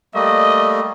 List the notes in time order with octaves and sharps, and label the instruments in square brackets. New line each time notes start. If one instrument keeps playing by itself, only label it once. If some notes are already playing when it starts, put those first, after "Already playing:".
[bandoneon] G3 A3 A#3 [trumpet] D#5